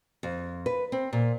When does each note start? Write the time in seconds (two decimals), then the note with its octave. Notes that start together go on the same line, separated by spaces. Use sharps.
0.23 F2
0.66 B4
0.92 C4
1.13 A#2